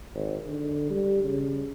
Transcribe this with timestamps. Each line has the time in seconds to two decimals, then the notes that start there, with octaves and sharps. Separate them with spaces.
0.15 G#1
0.46 D3
0.90 G3
1.24 C#3